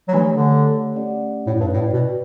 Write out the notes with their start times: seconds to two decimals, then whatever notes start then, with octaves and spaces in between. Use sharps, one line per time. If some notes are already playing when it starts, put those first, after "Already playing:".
0.08 F#3
0.13 E3 A3 D4 G4 C#5
0.33 D3
0.94 A3 C#4 G4 D5 F#5
1.47 A2
1.60 G2
1.73 A2 F#4 B4 D5 G5
1.93 B2